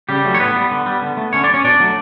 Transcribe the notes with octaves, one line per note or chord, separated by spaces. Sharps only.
C#3 G3 G4
F#3 A3
C#5
A2 B3 B4
G3
D3
G3
D3
A3
D3 C#4 C#5
D4 D5
G3
C#4 C#5
B2 D4 D5
F#3 A3